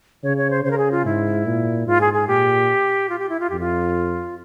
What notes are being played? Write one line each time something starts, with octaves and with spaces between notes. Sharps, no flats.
C#3 C#5
C#5
C5
C#3 C5
A#4
G#4
F4
G#2 E4
A#2
G#2 F4
G#4
G#4
A#2 G4
F4
G4
E4
F4
F2 G4
F4